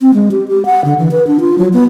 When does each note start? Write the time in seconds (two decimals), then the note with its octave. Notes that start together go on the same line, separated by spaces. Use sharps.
0.01 C4
0.14 G#3
0.31 G4
0.48 G4
0.65 F#5
0.85 D3
0.99 E3
1.12 B4
1.27 D4
1.40 F4
1.58 F#3
1.73 B3